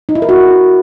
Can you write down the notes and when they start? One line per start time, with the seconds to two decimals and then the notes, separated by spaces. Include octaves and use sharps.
0.09 D#4
0.15 E4
0.22 A#4
0.29 F#4